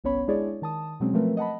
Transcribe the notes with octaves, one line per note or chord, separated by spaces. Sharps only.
G1 C2 B3 C#4 C#5 B5
G#3 D4 E4 G#4 C#5 D5
D#3 A5 D#6
B2 F#3 G#3 C4 C#4
F3 F#3 A3 C4 A#4 B4
D#5 F#5 A5 B5